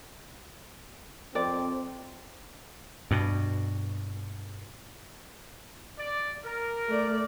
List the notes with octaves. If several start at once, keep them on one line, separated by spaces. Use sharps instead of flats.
F2 C4 D5
G2 B2
D5
A#4
A3 D5